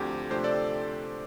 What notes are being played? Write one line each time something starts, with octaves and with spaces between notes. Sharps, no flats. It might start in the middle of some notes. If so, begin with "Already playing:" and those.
Already playing: D2 D3 F3 C4 G4
C3 F3 A3 D4 G4 C5
A4 D5